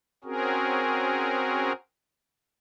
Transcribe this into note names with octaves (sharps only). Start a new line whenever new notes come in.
C4 C#4 F#4 G#4 A#4